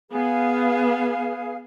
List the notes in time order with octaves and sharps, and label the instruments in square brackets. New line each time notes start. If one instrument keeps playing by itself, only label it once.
[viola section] B3 [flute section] G#4 F5